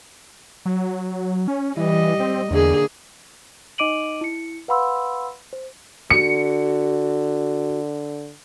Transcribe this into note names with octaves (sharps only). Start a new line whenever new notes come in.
F#3
C#4
E3 G3 D#5
C4
E2 D3 A#3 G#4
D#4 D#5 D6 D7 D#7 F#7
E4 C#7
B4 F5 F#5 B5 C6 E6
C5
D3 F#4 C#7